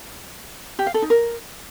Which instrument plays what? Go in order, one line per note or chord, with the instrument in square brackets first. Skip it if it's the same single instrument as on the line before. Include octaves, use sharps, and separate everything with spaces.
[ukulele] G4
F5
A4
D#4
A#4